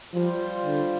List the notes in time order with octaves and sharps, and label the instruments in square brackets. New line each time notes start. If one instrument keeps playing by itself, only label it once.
[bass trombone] F3 [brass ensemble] G3 F4 C5
[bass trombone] D3